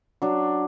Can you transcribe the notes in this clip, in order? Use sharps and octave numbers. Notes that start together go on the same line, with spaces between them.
F#3 D4